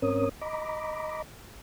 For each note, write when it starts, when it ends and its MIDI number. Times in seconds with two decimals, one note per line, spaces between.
0.02 0.29 44
0.02 0.29 60
0.02 0.29 61
0.02 0.29 70
0.02 0.29 73
0.02 0.29 87
0.42 1.22 75
0.42 1.22 82
0.42 1.22 83
0.42 1.22 86